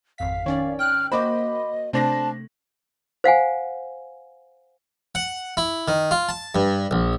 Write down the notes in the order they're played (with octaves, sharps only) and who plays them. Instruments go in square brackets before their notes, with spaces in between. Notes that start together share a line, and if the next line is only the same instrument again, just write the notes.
[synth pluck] G#1 F2 B6 [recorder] F5
[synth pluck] D#3 C#4 D5 [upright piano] C#5
[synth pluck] G5 F#6 [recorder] F6
[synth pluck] A#3 F#4 C5 [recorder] D#5 [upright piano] B5 D6
[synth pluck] C3 A3 [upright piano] C4 D4 A#6 [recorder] A5
[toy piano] C5 F5 F#5 G#5
[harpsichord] F#5
E4
D#3
F4
A5
G2
A#1